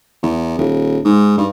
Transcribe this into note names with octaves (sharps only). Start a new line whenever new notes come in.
E2
D#1
G#2
G2